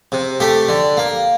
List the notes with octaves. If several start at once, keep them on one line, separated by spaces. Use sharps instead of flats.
C3
A3 G4
D3
A#3